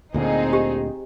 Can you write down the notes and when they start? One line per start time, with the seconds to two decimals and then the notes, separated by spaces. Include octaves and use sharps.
0.14 D2 A#2 D3 C4 D#4 G#4
0.53 G4